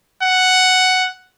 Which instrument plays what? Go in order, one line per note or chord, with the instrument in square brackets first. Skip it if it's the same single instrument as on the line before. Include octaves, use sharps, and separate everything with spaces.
[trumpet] F#5